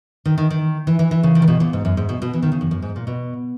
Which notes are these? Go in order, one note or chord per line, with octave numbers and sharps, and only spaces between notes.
D#3
D#3
D#3
E3
E3
E3
C#3
D#3
C#3
B2
A#2
G#2
F#2
G#2
B2
B2
E3
D#3
C#3
F#2
F#2
G#2
A#2
B2